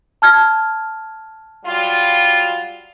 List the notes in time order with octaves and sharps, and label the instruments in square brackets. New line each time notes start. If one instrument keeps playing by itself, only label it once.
[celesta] A5 F6 G#6
[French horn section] F#3 G3 F4